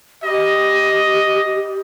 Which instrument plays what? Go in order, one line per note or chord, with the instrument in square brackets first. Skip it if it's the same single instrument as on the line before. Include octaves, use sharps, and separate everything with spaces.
[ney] G4 [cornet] D#5